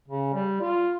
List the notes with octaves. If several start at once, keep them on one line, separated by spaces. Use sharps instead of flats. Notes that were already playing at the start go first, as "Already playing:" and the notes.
C#3
G3
F4